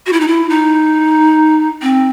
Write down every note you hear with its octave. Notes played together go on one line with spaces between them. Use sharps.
F#4
E4
D#4
E4
D#4
C4